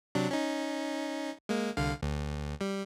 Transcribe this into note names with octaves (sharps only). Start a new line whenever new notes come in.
C3 F#3 D4
C#4 D#4
G#3 A#3
C2 D3 F5
D2
G3